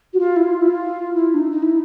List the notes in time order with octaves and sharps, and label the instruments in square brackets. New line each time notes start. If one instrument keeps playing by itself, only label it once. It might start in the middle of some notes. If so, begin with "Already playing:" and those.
[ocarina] F#4
F4
E4
F4
E4
F4
E4
D4
D#4
D#4
E4